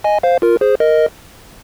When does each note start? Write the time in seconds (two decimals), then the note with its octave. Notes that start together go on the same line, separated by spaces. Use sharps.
0.04 D#5 G#5
0.23 C5 F5
0.42 F4 A#4
0.61 G#4 C5
0.80 A#4 D#5